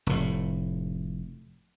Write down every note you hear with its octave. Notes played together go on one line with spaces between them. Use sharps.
F1 A2